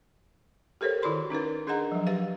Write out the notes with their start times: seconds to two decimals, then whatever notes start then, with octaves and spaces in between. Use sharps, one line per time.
0.81 G4 A4 A#4 C5 C#5
1.02 D#3 E4 F#4 D5 B5 C6
1.30 C#4 D#4 A#4 B4
1.67 D4 G#4 A#4 D#5 F#5 A#5
1.92 F3 F#3
2.07 G4 B4 F5